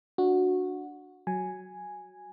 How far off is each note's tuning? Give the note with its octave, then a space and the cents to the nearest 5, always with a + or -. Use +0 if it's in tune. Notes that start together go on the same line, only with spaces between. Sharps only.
D4 +0 F#4 -15
F#3 +0 G#5 +0